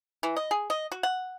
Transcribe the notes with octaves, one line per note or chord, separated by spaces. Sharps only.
E3
D#5
G#4
D#5
F#4
F#5